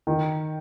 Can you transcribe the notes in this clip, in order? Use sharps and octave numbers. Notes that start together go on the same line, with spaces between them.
D#3